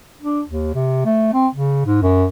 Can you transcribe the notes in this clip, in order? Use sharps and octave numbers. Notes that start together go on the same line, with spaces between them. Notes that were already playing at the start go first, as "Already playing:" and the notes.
D4
D#2
C3
A3
C4
C#3
G#2
F#2